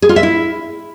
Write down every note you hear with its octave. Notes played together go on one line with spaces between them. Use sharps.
G#4
F4
E5
E4